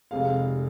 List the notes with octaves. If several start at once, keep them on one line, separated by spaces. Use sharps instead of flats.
F1 F2 C3 G#3 F5